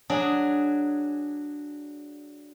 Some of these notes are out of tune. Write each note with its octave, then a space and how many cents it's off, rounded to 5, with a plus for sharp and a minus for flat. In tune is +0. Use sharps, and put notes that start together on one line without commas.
F#3 +0 D4 +0 G#4 +0